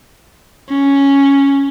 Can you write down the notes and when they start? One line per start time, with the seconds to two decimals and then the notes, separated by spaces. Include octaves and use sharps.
0.69 C#4